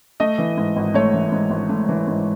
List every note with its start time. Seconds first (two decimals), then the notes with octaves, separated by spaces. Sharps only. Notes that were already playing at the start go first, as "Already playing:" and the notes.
0.20 A3 D#5
0.38 E3
0.57 G#2
0.76 G#1
0.94 A3 C#5
1.13 E3
1.32 G#2
1.50 G#1
1.69 A3
1.88 E3
2.08 G#2